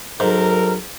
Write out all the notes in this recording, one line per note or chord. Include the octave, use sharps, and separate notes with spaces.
G#2 F#3 A4 A#4